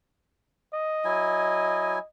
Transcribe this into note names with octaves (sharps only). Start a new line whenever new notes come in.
D#5
F#3 E4 G#5